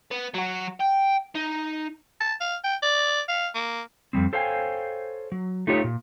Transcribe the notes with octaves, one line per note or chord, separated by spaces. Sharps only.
B3
F#3 F#4
G5
D#4
A5
F5
G5
D5
F5
A#3
F2 C#3 G3 C4
A4 C5 C#5 F5 G5 G#5
F#3
A3 D#4 F4 G4 C#5
A#2